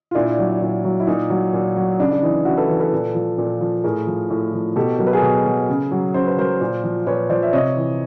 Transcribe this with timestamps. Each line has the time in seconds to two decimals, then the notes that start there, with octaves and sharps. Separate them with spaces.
0.11 F4
0.15 A#2 D4 E4
0.39 F#3
0.61 A#2
0.84 F#3
1.00 E4
1.07 A#2 D#4
1.30 F#3
1.53 A#2
1.76 F#3
1.99 C#3 D4
2.11 D4
2.22 E3 D#4
2.45 C#3 E4 F#4
2.57 A4 B4
2.69 E3
2.80 A4 B4
2.92 A#2
3.15 F3
3.38 A#2
3.61 F3
3.84 A2 G#4 A#4
4.07 F3
4.30 A2
4.53 F3
4.76 B2 G4 A4
4.99 F#3 A#4
5.07 B4
5.13 G#4 A#4
5.22 B2
5.45 F#3
5.69 C#3
5.91 F#3
6.14 C#3 C5
6.27 B4
6.38 F#3 A#4 C5
6.61 A#2
6.84 F3
7.07 A#2 B4 C#5
7.30 F3 C5 D5
7.43 E5
7.53 C3 C#5 D#5
7.76 E3